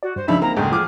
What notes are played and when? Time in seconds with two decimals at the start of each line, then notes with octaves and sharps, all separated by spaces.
0.03 F#4 D5
0.16 G2 C5
0.28 C#2 F3 D4 D#4 E5 B5
0.41 A#3 C4 A#5
0.57 F#1 D2 A2 G#3 G#4 G5
0.71 F3 D6 F6